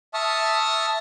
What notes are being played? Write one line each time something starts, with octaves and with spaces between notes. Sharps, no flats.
E5 A5 C#6 D#6 F6